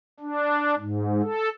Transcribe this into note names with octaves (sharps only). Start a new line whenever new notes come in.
D4
G#2
A4